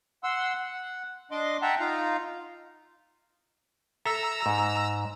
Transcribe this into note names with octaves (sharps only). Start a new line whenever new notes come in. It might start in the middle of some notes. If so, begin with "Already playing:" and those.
F#5 C6 E6
F#5
D4 D#5 C6 D6
E5 F#5 G5 A5 A#5
D#4 F4 F5 A#5
A4 E5 A#5 E6
G#2